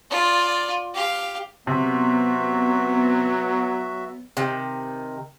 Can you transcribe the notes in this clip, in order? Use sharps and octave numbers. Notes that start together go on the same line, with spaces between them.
F4 D5
G4 F5
C3 F#3 B3 F#4 E5
C3 D#3